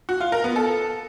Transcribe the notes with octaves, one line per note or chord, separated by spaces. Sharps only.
F#4
F4
A#4
B3
A4